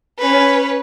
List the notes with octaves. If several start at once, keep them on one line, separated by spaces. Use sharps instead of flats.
C#4 B4